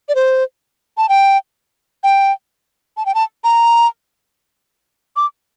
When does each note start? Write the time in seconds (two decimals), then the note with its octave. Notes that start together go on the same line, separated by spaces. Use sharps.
0.09 D5
0.15 C5
0.98 A5
1.09 G5
2.04 G5
2.97 A5
3.06 G5
3.15 A5
3.44 A#5
5.16 D6